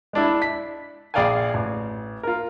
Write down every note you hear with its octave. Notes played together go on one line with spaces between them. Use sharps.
G#3 D4 E4
B6
A#1 G#4 D5 F5 G5 G#5
A1
F4 A#4